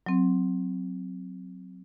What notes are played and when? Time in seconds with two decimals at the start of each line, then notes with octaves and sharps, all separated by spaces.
0.06 F#3 C4